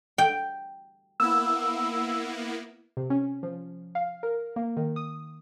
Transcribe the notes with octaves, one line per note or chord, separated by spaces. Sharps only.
G5
A#3 B3 E4 E6
C3
C#4
F3
F5
A#4
A#3
D#3
D#6